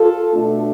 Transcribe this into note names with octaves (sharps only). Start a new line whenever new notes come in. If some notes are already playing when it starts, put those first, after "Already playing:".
Already playing: F4 A4
B2 A3 D4